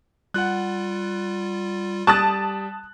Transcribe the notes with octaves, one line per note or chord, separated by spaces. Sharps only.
G3 F4 F#5 F#6
G3 A5 D#6 F#6 A6